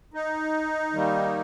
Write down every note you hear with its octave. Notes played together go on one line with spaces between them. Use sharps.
D#4
D#3 G3 A#3